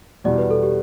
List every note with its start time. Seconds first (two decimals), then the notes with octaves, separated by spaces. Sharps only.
0.24 E2 B2 G3 D5
0.38 B4
0.51 A4
0.63 G4